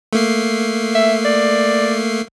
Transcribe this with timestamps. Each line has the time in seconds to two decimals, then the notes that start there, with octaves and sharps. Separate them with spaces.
0.13 A3 A#3 C7
0.95 E5
1.25 D5